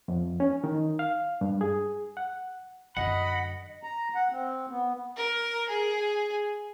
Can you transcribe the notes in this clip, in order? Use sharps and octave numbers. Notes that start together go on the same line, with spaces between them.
F2
C#4
D#3
F5
G2
G#4
F#5
F#2 D3 D#5 F#5 B5
A#5
F#5
C4
B3
A#4
G#4